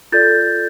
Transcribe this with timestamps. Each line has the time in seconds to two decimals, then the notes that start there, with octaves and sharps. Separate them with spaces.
0.12 F4 A4 D5 G6 A6